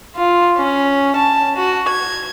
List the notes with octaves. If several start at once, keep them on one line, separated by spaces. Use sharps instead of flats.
F4
C#4
A5
F#4
G#6